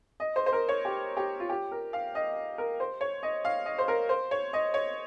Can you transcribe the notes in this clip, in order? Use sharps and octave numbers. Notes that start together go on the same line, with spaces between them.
D#5
C5
C5
A#4
C#5
G4
G4
F4
G4
A#4
F5
D#5
A#4
C5
C#5
D#5
F5
D#5
C5
A#4
C5
C#5
D#5
C#5